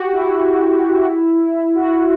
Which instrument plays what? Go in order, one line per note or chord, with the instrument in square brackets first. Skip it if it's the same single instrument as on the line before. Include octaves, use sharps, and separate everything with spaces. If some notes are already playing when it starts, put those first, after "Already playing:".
Already playing: [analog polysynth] F#4 G4
E4
F#4